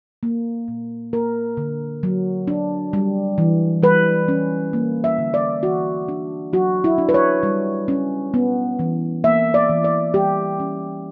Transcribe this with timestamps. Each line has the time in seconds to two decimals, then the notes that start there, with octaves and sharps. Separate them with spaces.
0.23 A#3
0.68 A#2
1.13 A#3 A#4
1.57 D3
2.03 F#3
2.48 D4
2.93 G3
3.38 E3
3.83 G3 B4
4.28 C#4
4.73 A#3
5.04 E5
5.18 D3
5.34 D5
5.63 E3 F#4
6.08 D4
6.53 F#3 F#4
6.84 E4
6.98 D4
7.09 B4
7.14 C#5
7.43 G3
7.88 C#4
8.34 B3
8.79 E3
9.24 A#3 E5
9.54 D5
9.69 E3
9.84 D5
10.14 G3 G4
10.60 C#4